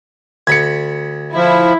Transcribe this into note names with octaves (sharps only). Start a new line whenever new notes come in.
D2 B5 G#6 C#7
F3 E4